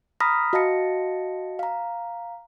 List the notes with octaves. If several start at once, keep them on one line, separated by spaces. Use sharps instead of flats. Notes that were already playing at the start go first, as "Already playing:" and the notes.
A#5 B5 D#6 F6 A#6 B6
F#4 D#5 F5 A5 A#6 C#7
F5 A#5